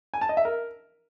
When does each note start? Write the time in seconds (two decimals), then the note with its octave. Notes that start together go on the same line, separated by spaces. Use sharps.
0.14 G#5
0.21 A5
0.29 D#5
0.37 E5
0.45 A#4